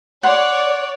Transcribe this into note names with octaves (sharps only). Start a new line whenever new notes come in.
C#5 D5 F#5 C6